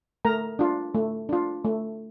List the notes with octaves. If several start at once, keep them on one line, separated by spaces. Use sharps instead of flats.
A3 A#4 A#5
D4 F4
A3
D4 F4
A3